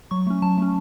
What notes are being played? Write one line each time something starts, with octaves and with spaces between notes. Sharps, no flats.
F#3 C#6
A3 C#4
F#3 A5
A3 C#4